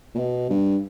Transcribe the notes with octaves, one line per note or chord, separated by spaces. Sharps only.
A#2
B2
G2